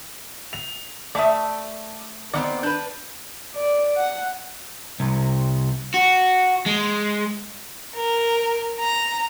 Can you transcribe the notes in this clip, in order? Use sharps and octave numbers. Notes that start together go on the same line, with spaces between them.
F7
A3 D5 E5 A5 D#6
D#3 B3 C4 D5
D4 B4 G6
D5
F#5
C2
F#4
G#3
A#4
A#5